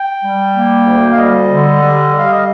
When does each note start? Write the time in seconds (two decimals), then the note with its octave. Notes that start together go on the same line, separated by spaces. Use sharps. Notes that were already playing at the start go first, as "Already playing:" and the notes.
Already playing: G5
0.24 G3
0.55 A#3
0.87 D2
1.12 F5
1.18 G3 D#5
1.50 D3
1.81 G3
2.13 G3
2.19 F5
2.32 D#5